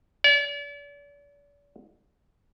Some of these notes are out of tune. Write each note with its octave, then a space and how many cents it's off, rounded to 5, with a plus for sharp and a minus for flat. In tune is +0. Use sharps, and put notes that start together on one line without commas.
D5 -40